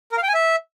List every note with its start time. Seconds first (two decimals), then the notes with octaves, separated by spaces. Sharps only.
0.12 A#4
0.17 F5
0.23 G5
0.28 G#5
0.34 E5